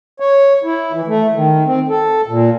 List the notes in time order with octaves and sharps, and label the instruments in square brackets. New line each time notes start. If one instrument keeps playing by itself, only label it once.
[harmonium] C#5
E4
E3
A3
D#3
C4
A4
A#2